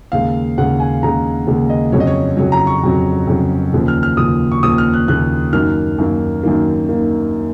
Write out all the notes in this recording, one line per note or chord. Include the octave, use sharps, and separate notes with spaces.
D#2 C#3 G#3 F5
D#2 C#3 G#3 F#5
G#5
D#2 C#3 G#3 A#5
D#2 C#3 G#3
D#5
F2 C#3 F#3 C#5
D#5
C#5
F2 C#3 F#3 C#5
A#5
C#6
F2 C#3 F#3
F2 C#3 F#3
D#2 C#3 F3
F6
F6
D#2 C#3 F3 D#6
C#6
D#2 C#3 F3 D#6
F6
F#6
D#2 C#3 F3 F#6
F#2 D#3 A#3 F6
F#2 D#3 A#3
F#2 D#3 A#3
D#3 A#3